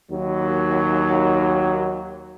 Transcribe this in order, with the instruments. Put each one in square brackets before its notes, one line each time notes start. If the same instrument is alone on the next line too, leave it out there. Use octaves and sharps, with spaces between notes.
[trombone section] D#2 F#3